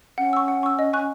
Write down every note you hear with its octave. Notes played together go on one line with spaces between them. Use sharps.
C#4 F#5
C#6 E6
F#5
C#6 E6
D#5
G#5 C#6 F#6